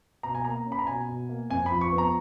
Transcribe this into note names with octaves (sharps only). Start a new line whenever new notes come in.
B2 A#5
G#5
A#3 A#5
C#4
B5
A#5
B2 G#5
B2
A#3
F2 G#5
B5
F3
C#6
B3
A#5